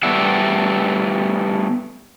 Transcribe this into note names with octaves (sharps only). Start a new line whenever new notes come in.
G3 A3 B3 D5 E5 F#5